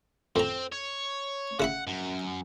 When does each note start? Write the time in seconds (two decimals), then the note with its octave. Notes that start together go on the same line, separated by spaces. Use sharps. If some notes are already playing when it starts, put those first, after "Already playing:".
0.36 F2 C4 A#5
0.72 C#5
1.60 C#3 E4 F#5 B5
1.87 F#2